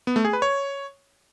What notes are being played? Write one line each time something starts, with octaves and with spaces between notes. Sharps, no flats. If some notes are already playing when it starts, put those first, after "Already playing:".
B3
A3
G#4
B4
C#5